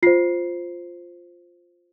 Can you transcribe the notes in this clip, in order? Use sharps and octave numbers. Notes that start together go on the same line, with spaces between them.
F4 C5 C7